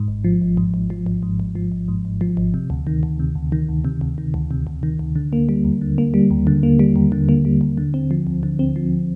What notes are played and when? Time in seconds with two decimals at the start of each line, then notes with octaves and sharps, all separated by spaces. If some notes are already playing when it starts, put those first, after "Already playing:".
Already playing: G#2
0.08 G#1
0.24 F3
0.41 G#1
0.57 G#2
0.74 G#1
0.90 F3
1.06 G#1
1.23 G#2
1.40 G#1
1.55 F3
1.72 G#1
1.88 G#2
2.05 G#1
2.21 F3
2.37 G#1
2.54 C3
2.70 D2
2.87 D#3
3.03 D2
3.19 C3
3.35 D2
3.52 D#3
3.69 D2
3.85 C3
4.01 D2
4.18 D#3
4.34 D2
4.51 C3
4.67 D2
4.83 D#3
4.99 D2
5.16 D3
5.33 A#3
5.49 G3
5.65 D#2
5.81 D3
5.98 A#3
6.14 G3
6.31 D#2
6.47 D3
6.63 A#3
6.79 G3
6.96 D#2
7.12 D3
7.29 A#3
7.45 G3
7.61 D#2
7.78 D3
7.94 C4
8.11 F3
8.27 D2
8.43 D3
8.59 C4
8.76 F3